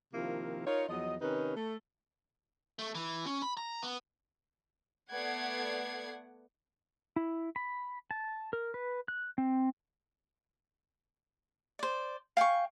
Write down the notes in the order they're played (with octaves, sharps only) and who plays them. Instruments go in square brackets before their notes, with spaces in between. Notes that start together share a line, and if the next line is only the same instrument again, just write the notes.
[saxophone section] C3 D#3 F3 A#3 E4 F4
D#4 F4 A#4 C#5
E2 F3 F#3 D#5
C3 D#3 C#4 D#4 B4
A3
[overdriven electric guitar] A3
E3
C#4
B5
A#5
B3
[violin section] A3 B3 D5 F#5 G#6 C7
[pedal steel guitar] E4
B5
A5
A#4
B4
F#6
C4
[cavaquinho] C5 D5
F5 G5 G#5 C#6